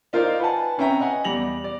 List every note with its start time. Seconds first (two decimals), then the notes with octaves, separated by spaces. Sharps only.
0.13 D#4 F4 A#4 C5 D5 F5
0.40 B4 F#5 G#5 A5
0.78 C4 C#4 B4 E5 G5 A#5
1.00 D#5 F#5 G#5
1.24 E2 G3 A#6 F7 F#7
1.64 D5